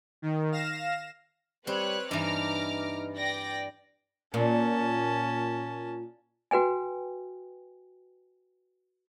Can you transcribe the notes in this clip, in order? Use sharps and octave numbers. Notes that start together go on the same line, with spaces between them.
D#3
F5 A#6 E7
G3 C4 B4 C#5 F#6
G2 E3 D#4 A#5 D6 F6
D5 G5 A#6
A#2 C#4 A5
F#4 B4 G5 G#5